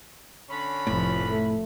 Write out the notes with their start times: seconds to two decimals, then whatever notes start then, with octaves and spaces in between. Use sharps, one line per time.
0.50 D3 C#4 B5
0.87 F1 A2 F3
1.29 A3